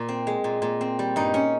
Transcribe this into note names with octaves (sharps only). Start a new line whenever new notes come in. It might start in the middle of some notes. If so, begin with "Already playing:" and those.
Already playing: A#2
C4
G#3
A#2
A#2
C4
G3
G2 D#4
C#4